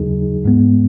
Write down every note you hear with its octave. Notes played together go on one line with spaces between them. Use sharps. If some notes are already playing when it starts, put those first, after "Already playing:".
Already playing: D#2 C#3 F#3 D#4 G#4
G#2 G#3 B3